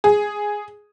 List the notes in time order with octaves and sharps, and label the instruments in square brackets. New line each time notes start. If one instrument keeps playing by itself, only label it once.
[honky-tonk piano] G#4